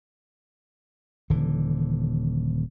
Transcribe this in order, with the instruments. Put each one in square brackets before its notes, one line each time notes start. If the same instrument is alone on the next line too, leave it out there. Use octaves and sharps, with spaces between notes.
[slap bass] D#1 D3 E3